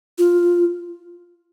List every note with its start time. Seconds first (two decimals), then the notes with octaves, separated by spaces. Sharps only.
0.18 F4